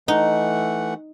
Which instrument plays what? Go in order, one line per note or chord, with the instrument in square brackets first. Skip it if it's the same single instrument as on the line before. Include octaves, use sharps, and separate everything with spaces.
[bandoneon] E3 A3 F#5 [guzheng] D#4